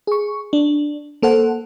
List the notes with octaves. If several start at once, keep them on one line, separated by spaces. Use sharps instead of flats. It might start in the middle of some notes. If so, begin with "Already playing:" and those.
G#4 C#6
D4
A#3 A4 C5 F#5